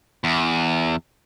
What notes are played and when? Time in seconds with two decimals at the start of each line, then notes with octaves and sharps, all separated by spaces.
0.24 E2